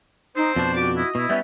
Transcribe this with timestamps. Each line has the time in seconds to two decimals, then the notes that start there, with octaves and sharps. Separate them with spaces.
0.36 C4 D#4 C5
0.56 F2 B2 D4 A5
0.74 F#4 G4 D5 D6
0.97 E4 D#5
1.15 B2 E4
1.29 G3 B3 C#4 E5